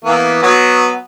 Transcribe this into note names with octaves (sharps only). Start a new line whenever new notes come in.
E3 A#3 B3
F#3 B3